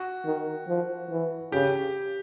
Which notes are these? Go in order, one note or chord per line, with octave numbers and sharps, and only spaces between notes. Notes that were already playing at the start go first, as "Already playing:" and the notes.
Already playing: F#4
D#3
F3
E3
C#3 G4